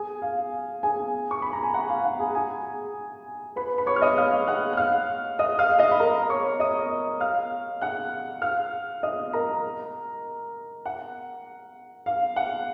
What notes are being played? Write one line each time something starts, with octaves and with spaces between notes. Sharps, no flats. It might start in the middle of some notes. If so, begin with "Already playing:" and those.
Already playing: G#4 G#5
F5
G#4 G#5
C#6
B5
A#5
G#5
F#5
F5
F#5
G#4 G#5
G#4 G#5
B4 B5
B5
C#5 C#6
F6
D#5 D#6
F5 F6
F#5 F#6
F#6
F5 F6
D#5 D#6
F5 F6
D#5 D#6
B5
A#4 A#5
C#5 C#6
D#5 D#6
F5 F6
F#5 F#6
F5 F6
D#5 D#6
A#4 A#5
F#5
F5
F#5